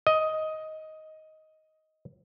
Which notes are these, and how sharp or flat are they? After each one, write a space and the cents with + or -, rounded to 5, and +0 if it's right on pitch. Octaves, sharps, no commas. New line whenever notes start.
D#5 +10